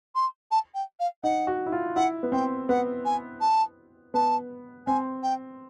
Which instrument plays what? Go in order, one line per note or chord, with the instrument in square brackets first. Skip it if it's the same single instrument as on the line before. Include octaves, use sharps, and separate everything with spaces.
[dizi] C6
A5
G5
F5
[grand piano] D#4 [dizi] F#5
[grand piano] F#4
E4
F4
[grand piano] E4 [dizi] F#5
[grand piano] B3
[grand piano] C4 [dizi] G5
[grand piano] B3 [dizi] F#5
[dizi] G#5
A5
[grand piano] B3 [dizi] A5
[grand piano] C4 [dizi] G#5
[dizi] G5